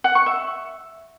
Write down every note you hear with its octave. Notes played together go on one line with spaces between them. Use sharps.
F#5
C#6
E5